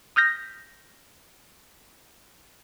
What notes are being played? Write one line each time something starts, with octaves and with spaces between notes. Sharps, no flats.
D#6 F6 G6 A#6 B6